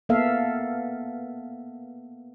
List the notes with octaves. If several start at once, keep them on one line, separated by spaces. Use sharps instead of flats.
A#3 B3 A4 E5 F5